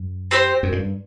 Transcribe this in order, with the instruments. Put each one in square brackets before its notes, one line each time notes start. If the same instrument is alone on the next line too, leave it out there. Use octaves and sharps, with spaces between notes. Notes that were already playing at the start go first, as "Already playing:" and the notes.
Already playing: [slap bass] F#2
[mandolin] C4 G4 C5
[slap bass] F#2
A2
G2